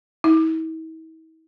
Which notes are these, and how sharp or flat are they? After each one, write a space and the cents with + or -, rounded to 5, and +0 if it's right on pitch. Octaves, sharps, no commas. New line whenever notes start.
E4 -45